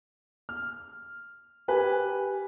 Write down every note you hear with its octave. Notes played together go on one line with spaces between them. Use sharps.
F6
G4 B4 G#5